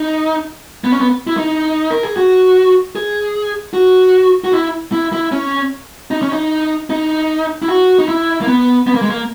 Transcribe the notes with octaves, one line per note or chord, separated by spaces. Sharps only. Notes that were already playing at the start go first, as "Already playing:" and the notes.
Already playing: D#4
B3
C#4
B3
E4
D#4
A#4
G#4
F#4
G#4
F#4
F#4
E4
E4
E4
C#4
D#4
C#4
D#4
D#4
E4
F#4
D#4
E4
A#3
B3
B3
A#3
G#3
A#3